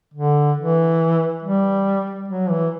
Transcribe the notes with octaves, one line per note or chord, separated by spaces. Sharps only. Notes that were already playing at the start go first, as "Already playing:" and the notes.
D3
E3
G3
F#3
E3